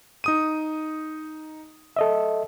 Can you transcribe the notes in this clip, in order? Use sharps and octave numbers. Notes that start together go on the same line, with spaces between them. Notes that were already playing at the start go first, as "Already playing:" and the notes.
D#4 D#6 D#7
A4 D#5 E5